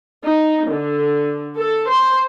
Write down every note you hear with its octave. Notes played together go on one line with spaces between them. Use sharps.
D#4
D3
A4
C5